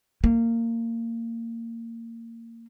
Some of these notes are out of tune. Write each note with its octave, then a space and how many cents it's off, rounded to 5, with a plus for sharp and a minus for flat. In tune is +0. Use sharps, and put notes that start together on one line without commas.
A#3 -20